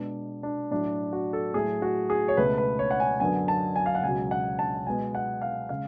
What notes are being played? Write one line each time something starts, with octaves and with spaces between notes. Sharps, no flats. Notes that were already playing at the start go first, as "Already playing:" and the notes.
Already playing: B2 G#3 B3 D4
D4
A2 F#3 A3 D4
F#4
A4
A2 F#3 A3 G#4
F#4
G#4
C#5
C#2 B2 A3 B4
B4
C#5
F#5
G#5
F#2 D3 F#3 B3 G#5
A5
G#5
F5
F#5
C#2 B2 F#3 G#5
F#5
A5
B2 G#3 B3 G#5
F#5
F5
C#3 G#3 F5